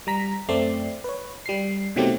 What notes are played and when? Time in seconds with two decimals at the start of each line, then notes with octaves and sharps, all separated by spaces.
0.07 G3 A#5 B6
0.49 F#2 A3 C4 D5 C7
1.04 B4 C#5
1.46 G3 C7
1.96 B2 D#3 F#3 A3 C4 G4